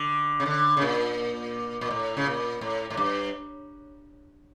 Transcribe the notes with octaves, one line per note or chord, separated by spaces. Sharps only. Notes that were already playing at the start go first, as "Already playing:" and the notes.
Already playing: D3
C#3
D3
C#3
A#2
A#2
A2
C#3
A#2
A2
A2
G2